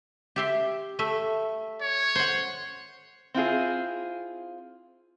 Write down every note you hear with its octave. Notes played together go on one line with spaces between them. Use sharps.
G4 E5 C6
A3 E5
C#5
C5 F#5
C4 E4 F4 G#4